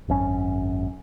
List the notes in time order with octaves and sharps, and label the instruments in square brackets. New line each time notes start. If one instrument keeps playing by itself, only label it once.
[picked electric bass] G#1 F#2 C#4